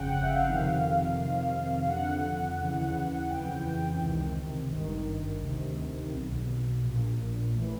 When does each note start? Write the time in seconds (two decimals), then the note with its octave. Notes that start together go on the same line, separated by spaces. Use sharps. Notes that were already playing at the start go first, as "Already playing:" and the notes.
Already playing: G1 F2 C#3 F#5 G5
0.12 F#5
0.22 E5
0.29 F5
0.47 F2 C3 D#3 F5
1.17 F2 C3 D#3
1.88 F2 D3 F#5
2.59 D#2 C#3 E3
3.17 F#5
3.29 F2 C#3 E3 G5
4.00 C#2 C3 D#3
4.71 G#1 G2 D#3
5.41 D2 C3 D#3
6.12 B1 B2
6.83 A#1 A#2
7.53 A1 A2 E3